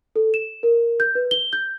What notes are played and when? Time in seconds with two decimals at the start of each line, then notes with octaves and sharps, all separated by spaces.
0.16 A4
0.34 E7
0.63 A#4
1.00 G6
1.15 B4
1.31 G7
1.53 G6